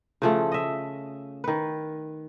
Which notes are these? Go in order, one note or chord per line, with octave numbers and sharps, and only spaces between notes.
C#3 F3 A3
D#5 E5
D#3 B4